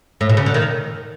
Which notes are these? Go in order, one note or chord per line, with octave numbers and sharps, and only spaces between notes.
A2
B2
C#3
D3
D#3